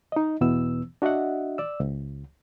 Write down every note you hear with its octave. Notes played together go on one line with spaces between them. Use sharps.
D#4 D#5
E2 B2 E3 B3 E6
D4 F#4 D#5 E5 F#5
D5 E6
C#2